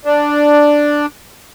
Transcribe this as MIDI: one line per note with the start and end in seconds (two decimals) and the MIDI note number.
0.05 1.06 62